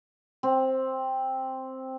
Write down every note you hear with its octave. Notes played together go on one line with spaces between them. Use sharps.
C4